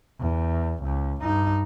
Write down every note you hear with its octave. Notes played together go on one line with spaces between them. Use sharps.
E2
C#2
G2 D#4